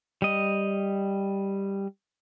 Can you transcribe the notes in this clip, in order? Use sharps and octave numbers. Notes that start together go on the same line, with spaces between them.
G3 D#5